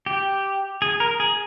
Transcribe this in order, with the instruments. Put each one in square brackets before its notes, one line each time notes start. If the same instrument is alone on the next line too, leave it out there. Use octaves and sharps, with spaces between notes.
[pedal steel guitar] G4
G#4
A#4
G#4